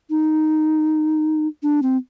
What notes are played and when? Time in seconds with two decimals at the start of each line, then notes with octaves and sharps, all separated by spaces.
0.10 D#4
1.63 D4
1.82 C4